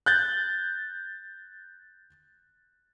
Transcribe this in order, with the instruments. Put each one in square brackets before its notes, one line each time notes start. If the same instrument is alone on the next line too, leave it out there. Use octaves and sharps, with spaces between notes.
[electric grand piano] F#6 G6 A6